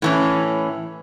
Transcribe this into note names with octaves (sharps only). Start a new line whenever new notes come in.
A2 E3 C#4